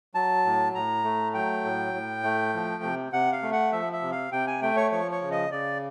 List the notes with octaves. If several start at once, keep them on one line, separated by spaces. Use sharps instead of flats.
F#3 A5
A2
A2 A#5
A3
F#3 G5
A2
A2
A3
F3
C3
C3 F#5
F5
A3
F#5
F3 E5
E5
C3
F5
C3 G5
G#5
A3 G5
C#5
F3 C#5
C#5
C#3
D#5
C#3 D5